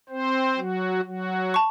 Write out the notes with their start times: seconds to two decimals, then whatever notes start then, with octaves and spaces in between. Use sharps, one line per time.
0.09 C4 C5
0.57 F#3 F#4
1.05 F#3 F#4
1.54 A5 C#6